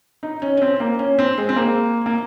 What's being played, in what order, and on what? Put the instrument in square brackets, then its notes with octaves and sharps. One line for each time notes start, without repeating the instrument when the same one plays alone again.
[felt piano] D#4
C#4
C#4
C4
A#3
C#4
C4
G#3
C4
A#3
A#3